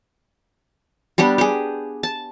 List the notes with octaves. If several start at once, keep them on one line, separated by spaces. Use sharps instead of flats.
G3 B3 D4 G4
G4 G#4
A5